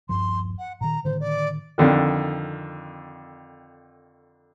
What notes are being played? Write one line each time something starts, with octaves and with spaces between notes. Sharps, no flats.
D#1 G2 F3 C6
F#5
A#2 D#3 A#5
A2 D3 D#3 C5
D5
F2 D3 D#3